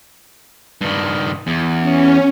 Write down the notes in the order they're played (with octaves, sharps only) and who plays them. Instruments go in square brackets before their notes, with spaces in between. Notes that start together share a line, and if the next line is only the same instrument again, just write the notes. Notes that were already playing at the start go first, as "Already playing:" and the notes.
[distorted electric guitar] G2 D#3
E2
[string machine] C#4